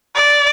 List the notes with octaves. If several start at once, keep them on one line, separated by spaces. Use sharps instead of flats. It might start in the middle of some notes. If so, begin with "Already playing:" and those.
D5